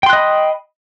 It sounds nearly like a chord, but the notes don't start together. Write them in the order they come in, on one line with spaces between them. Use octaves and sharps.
G5 C6 F#6 D#5 B5